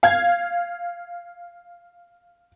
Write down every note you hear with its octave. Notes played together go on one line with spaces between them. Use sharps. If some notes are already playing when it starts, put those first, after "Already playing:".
F5 G#6